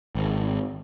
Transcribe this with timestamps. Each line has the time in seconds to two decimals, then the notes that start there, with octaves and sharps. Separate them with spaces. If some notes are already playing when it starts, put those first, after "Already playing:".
0.15 G#1